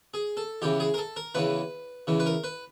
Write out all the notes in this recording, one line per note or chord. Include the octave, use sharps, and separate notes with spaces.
G#4
A4
E2 C#3 E3 G4
G#4
A#4
A4
A#4
E2 C#3 E3 B4
E2 C#3 E3
B4
A#4
B4